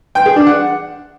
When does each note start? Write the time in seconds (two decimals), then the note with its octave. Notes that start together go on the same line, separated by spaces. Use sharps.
0.15 G5
0.26 G#4
0.36 D4
0.47 F#5